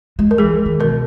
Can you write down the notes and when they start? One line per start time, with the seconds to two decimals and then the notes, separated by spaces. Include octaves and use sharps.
0.19 G#3
0.31 A#4
0.38 E3 G#4
0.66 D#3
0.79 B2 A#4